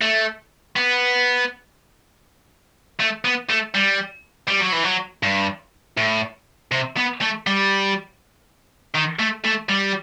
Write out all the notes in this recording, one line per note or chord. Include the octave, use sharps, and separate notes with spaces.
A3
B3
A3
B3
A3
G3
G3
F#3
E3
F#3
G2
A2
C3
B3
A3
G3
D#3
A3
A3
G3